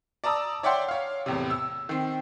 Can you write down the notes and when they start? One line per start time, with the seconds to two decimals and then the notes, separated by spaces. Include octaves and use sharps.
0.24 D5 A5 A#5 D#6 E6
0.63 C#5 D5 E5 F#5 G5 C6
0.88 C#5 F5
1.26 E2 A2 C3
1.50 E6
1.89 D#3 C4